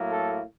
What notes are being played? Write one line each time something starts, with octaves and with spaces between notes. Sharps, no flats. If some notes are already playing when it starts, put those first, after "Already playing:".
Already playing: A2 F#3 A#3
A4